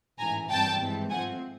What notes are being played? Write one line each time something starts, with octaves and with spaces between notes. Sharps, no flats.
A1 G#2 E3 G#5 A#5
G#1 G2 E3 G3 C4 G5 A5
G2 E3 G#3 C4
G#2 F3 A3 C4 F#5 G#5